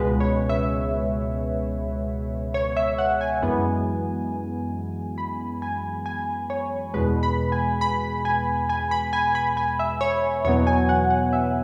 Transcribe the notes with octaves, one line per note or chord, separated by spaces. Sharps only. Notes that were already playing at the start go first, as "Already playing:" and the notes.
Already playing: C#2 B2 G#3 B3 B4
C#5
E5
C#5
E5
F#5
G#5
F#2 E3 G#3 B3
B5
G#5
G#5
C#5
E2 B2 G#3 B4
B5
G#5
B5
G#5
G#5
B5
G#5
B5
G#5
E5
C#5
E2 B2 F#3 B3 C#5
G#5
F#5
F#5
E5